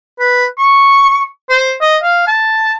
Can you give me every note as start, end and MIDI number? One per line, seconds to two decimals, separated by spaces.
0.20 0.45 71
0.58 1.24 85
1.50 1.73 72
1.81 1.97 75
2.03 2.24 77
2.27 2.74 81